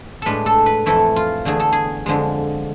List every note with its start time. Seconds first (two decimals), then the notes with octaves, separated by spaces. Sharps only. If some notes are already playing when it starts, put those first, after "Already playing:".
0.22 A2 G#3 D4 A4 B4
0.46 A4
0.66 B4
0.86 F2 E3 A3 E4 A4
1.16 F4
1.45 E2 D3 A3 G#4
1.60 A4
1.73 G#4
2.06 F2 D3 F3 G#3